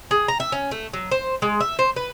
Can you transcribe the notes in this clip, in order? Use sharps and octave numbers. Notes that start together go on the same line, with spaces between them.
G#4
A#5
E5
C#4
A3
F#3
C5
G#3
E5
C5
B4